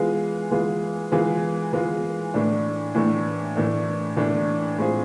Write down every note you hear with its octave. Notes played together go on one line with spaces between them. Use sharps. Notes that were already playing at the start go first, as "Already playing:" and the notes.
Already playing: E3 G#3 B3 F4 G#4
E3 G#3 B3 F4 G#4
E3 G#3 B3 F4 G#4
E3 G#3 B3 F4 G#4
A2 E3 A3 D4
A2 E3 A3 D4
A2 E3 A3 D4
A2 E3 A3 D4
A2 G#3 C4 F4 G#4